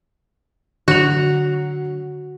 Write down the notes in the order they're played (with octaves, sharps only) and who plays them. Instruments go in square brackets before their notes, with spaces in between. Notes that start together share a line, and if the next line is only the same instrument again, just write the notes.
[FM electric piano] D3 [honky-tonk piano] F#3 F7 [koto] F#4